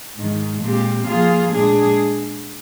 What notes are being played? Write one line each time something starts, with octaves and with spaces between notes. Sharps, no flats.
G#2 D#3 G#3
A#2 G#3 C4 G4
F3 A#3 F4 G#4
A#2 G#3 D4 G#4